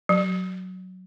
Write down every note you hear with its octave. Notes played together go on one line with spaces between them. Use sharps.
F#3